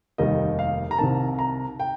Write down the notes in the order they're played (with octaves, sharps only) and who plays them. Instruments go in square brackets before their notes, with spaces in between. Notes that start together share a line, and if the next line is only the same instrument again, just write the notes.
[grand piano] F1 D#2 D#3 G3 D#5
F5
A#5
C2 C3 D#3 A5
A#5
G5